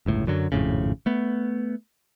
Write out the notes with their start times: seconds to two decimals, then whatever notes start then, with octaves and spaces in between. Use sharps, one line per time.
0.06 G1 C#2 A2
0.27 F#2 D3 F#3
0.52 G#1 F2 A2 C#3
1.06 A3 B3